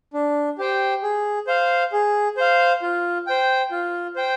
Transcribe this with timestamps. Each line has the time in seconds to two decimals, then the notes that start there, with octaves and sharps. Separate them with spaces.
0.13 D4
0.58 G4 C5 G5
1.03 G#4
1.47 C5 F5
1.92 G#4
2.37 C5 F5
2.82 F4
3.27 C5 G5
3.71 F4
4.16 C5 G5